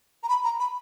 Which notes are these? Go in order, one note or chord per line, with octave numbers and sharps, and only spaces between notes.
A#5
B5
A#5
B5